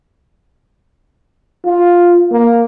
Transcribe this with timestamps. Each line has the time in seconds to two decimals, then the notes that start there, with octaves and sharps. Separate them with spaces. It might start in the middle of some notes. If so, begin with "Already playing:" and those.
1.65 F4
2.32 A#3